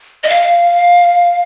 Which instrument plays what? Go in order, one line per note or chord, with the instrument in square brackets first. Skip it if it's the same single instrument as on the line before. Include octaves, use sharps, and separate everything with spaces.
[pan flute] D#5
F5